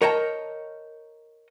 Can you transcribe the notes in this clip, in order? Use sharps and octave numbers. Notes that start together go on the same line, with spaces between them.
A#4 C#5 D#5 G5 A5 A#5